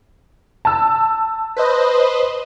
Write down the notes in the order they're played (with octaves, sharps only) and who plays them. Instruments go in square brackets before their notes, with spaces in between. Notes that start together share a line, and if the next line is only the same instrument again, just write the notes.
[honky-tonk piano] A5 E6
[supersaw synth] B4 C5 D#5